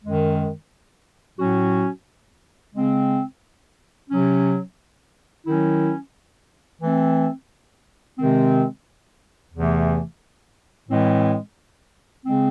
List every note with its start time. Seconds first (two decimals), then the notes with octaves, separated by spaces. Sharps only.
0.02 F#2 D#3 G#3
1.39 A2 F#3 C#4 F#4
2.75 C#3 G#3 C4
4.10 C3 F#3 C#4
5.46 D#3 F#3 C#4 E4
6.82 E3 A3 C4
8.18 C3 D#3 G#3 C4
9.54 E2 C3 E3 A3
10.89 A2 E3 G#3 C4
12.26 C#3 G#3 C4